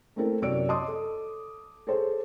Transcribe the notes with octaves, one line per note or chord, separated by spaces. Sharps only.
A3 A#3 C4 E4 A4 A#4
F#2 C3 C#5 D5 E6 D7
C#5 D#5 A5 C6 D6 D#6
A4
G#4 A4 C5 C#5